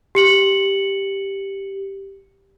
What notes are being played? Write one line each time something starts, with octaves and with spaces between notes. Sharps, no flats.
G4 C#7 F#7